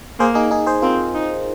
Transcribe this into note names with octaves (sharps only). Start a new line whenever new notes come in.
A#3 G#4 C5
D#4 G#4
D#4 G#4
G#4 C5
C4 F4 A#4
D#4